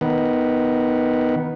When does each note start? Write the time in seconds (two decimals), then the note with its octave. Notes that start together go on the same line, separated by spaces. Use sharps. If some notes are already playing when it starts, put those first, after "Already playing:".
0.01 D#3 B3